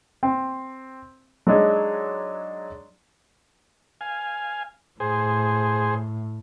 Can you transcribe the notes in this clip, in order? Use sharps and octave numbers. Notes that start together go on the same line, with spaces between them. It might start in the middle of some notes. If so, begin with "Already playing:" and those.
C4
F#3 G#3 D4 D#4
F5 G#5
A2 G#4 C5